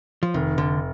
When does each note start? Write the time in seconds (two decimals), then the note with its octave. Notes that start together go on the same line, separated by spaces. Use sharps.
0.23 F3
0.34 F1 D#3
0.58 D3